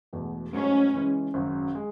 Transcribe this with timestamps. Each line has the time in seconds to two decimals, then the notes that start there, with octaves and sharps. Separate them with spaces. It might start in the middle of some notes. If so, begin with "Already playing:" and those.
0.13 E1 E2 B2 A3
0.53 G#2 F#3 A3 C#4 D#4
0.93 C#3 E3 G#3
1.34 G#1 F#2 C#3 F#3
1.75 G#3